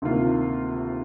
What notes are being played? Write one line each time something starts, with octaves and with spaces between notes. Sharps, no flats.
D2 C3 D#3 A#3 F4